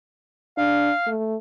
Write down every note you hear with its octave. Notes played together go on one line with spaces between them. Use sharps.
D4 F5
A3